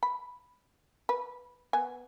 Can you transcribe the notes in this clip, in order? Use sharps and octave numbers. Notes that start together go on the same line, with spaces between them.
B5
B4
B3 G#5